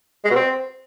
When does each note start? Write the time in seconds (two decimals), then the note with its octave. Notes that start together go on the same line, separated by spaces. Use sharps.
0.25 G#3
0.30 B2
0.36 C4